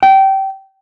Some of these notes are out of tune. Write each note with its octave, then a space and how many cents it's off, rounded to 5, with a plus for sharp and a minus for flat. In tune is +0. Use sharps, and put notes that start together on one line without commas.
G5 -20